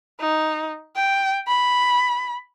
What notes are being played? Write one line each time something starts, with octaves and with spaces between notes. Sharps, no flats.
D#4
G5
B5